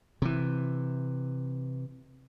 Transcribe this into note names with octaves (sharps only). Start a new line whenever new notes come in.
C3 E3